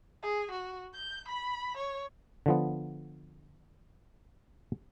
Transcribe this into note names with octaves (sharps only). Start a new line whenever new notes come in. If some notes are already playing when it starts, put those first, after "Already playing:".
G#4
F#4
G6
B5
C#5
D3 F3 B3